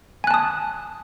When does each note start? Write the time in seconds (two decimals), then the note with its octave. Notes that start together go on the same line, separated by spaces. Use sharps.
0.24 G#5
0.27 F#6
0.31 A5
0.34 D#6